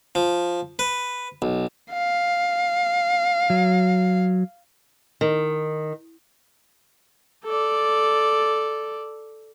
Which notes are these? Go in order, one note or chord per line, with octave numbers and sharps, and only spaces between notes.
F3
B4
B1
F5
F#3
D#3
A4 D5